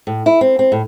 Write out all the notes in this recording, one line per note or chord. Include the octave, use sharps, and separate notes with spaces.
A2
E4
C4
C4
A2